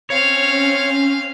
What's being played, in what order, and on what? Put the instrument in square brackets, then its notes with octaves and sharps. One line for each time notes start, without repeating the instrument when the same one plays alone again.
[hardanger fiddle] C4 F5 [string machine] C#4 [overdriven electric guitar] C#5